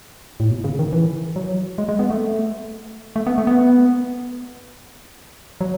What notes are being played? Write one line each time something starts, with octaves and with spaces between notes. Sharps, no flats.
A2
B2
C#3
D#3
E3
F#3
G#3
G#3
B3
A3
A3
B3
A3
B3
F#3